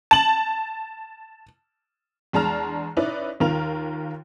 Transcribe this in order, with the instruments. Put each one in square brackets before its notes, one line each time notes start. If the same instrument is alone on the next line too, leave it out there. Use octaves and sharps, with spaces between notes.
[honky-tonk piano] A5 F#7
E2 G#3 D4 A5 A#5 F6
C#4 D#4 E4 B4 D5
D#2 D#3 F4 A#4 F7